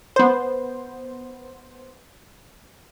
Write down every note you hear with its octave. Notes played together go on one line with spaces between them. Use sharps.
B3 C5